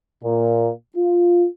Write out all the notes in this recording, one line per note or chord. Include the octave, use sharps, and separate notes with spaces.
A#2
F4